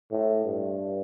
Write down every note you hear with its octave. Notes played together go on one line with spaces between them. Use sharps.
A2
G2